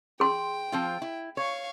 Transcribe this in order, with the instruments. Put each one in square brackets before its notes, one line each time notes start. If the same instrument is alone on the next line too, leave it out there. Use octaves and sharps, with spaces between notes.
[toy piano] G#4 C6 [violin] G5
[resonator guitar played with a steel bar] F3 C4 F4
E4
[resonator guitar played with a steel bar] C#5 [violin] F5 C#6